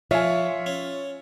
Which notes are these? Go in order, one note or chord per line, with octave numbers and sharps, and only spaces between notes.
F3 F4 C#5 E5 G#5
C#4